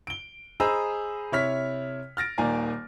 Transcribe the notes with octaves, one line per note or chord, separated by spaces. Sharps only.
D7 G7
G#4 C5 D#5 A#5 B5 E6
C3 E4 C#5 F6 B6
F6 A6 A#6 D7
D#1 D#3 A#3 D5 G#5 A#5